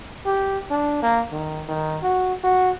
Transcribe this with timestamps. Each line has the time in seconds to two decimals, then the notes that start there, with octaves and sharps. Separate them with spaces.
0.26 G4
0.70 D4
1.02 A#3
1.32 D#3
1.69 D#3
2.03 F#4
2.44 F#4